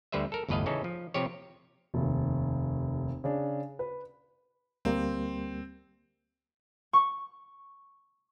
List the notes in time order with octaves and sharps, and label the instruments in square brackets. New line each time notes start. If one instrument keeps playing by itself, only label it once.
[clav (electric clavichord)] D2 D3 G3 B4 C5 E5
A4 A#4
G1 E2 A2 B4 D#5 F5
C#3 E3 C#4 D#4 A4
F3
C3 F3 G4 C#5
[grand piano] F1 D#2
C#3 D4
B4
[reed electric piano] D2 G3 A#3 [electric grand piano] C4
[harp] C#6